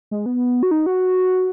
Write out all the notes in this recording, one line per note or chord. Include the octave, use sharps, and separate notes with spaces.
G#3
B3
F#4
D#4
F#4